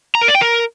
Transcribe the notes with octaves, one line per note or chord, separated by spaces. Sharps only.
A#5
A#4
D5
G5
A#4